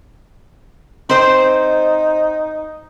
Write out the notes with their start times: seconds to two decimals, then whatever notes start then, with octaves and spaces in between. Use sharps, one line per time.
1.09 C4 D#4 C5